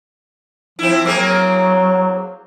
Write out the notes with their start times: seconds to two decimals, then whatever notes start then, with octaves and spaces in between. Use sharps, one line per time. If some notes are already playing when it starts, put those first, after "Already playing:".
0.79 F3 C4 E4
1.05 F#3 A#3 C4 G#4